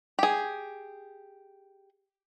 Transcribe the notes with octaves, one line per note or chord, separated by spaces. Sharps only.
G4 G#4